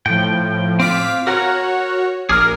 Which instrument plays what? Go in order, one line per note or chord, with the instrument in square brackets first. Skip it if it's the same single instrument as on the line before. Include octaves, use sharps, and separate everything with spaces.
[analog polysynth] A2 F3 [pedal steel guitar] G5
[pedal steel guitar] C4 F4 [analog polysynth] F5 D6 B6
[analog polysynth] F#4 C#5 [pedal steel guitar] A#4 F#5 A#5
[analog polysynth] A#1 A#4 [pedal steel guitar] G#4 D6 F6